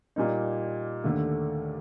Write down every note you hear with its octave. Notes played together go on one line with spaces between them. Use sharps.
A#2 G3 A#3 D#4
D#2 D3 A3